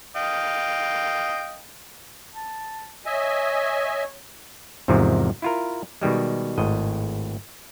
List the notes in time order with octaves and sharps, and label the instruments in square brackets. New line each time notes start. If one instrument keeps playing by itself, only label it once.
[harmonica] D#5 F5 G5
[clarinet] A5
[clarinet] C#5 [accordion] D#5 E5 G#5
[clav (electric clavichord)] E2 G#2 C3 D#3 F3
E4 F4 A#4
B2 D#3 G3 G#3
G#1 A2 D#5